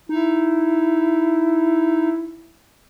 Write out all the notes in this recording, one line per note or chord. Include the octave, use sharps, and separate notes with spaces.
D#4 E4